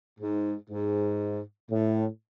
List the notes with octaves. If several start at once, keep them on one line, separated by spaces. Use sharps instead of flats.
G#2
G#2
A2